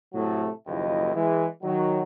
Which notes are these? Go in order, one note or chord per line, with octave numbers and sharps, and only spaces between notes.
A2 C3 F#3 A3
F#1 D#2 F3 E4 D#5
E3 G#3
D#3 F#3